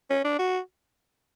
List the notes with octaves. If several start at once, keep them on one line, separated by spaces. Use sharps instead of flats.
C#4
D4
F#4